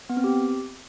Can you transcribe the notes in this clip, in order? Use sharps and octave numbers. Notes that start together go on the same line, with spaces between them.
B3
C4
G4